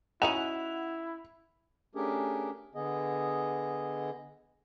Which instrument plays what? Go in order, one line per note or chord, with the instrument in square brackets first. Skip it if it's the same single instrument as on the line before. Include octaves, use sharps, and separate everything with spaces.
[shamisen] C#4 D#4 F#4 [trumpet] E4 [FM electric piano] F#5 [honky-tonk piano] F7
[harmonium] A3 C#4 D4 G4 G#4 A#4
D3 B3 G#4 D#5